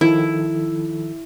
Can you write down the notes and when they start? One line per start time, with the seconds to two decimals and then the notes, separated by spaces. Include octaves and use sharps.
0.01 D#3 F3 E4 A4